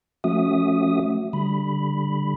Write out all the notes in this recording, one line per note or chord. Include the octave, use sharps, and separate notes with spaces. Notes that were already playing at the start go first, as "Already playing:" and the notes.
F3 A3 C#4 F#4 E5 D#6
D3 G3 B5